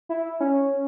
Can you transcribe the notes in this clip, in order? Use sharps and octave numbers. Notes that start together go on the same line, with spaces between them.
E4
E4
C#4